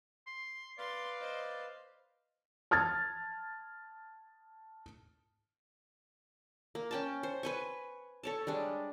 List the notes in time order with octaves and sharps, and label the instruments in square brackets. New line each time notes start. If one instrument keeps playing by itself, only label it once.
[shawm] C6
[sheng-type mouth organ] B4 F5 [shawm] D5 [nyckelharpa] C6
[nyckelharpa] C5 D#5
[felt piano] A5 F6 G#6 A6
[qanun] A#3
C#4 G5 A5
C5
B4 G#5 C#6
A4 C#5 A5
G3 G#3 D4